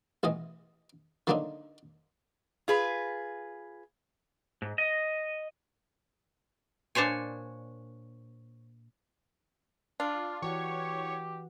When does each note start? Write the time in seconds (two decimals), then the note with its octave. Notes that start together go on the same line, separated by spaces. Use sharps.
0.23 A1 B2 E3 D#5
1.27 D3 F#3 A#3 C4 D4 D#4
2.68 F4 G#4 B4
4.62 G#2
4.78 D#5
6.95 A#2 D4 C5 C#5 G#5
10.00 D4 F4
10.42 E3 F#4 G4 C#5 F#5